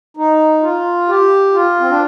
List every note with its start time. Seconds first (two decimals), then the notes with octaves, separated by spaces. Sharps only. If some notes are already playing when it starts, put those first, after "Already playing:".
0.17 D#4
0.63 F4
1.08 G4
1.54 F4
1.80 C4
1.90 D4